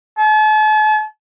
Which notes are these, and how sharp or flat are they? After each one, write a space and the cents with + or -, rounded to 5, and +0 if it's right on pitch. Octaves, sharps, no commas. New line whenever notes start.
A5 -45